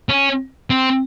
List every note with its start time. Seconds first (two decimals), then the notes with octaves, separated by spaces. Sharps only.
0.09 C#4
0.70 C4